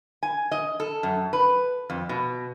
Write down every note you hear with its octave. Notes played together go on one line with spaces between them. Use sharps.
G#5
D#5
A4
F#2
B4
F2
B2